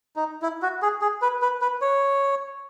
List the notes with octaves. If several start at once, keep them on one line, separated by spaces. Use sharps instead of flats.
D#4
E4
F#4
G#4
G#4
B4
B4
B4
C#5